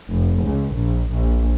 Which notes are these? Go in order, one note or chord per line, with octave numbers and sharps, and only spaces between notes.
F1
C#2
A#1
A#1